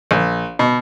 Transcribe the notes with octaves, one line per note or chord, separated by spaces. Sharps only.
A#1
B2